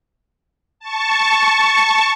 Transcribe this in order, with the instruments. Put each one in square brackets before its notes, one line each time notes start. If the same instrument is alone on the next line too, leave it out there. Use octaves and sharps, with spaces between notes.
[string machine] A5 C#6